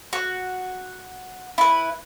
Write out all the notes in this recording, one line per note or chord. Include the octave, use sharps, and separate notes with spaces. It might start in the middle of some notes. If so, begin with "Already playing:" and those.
F#4
E4 B4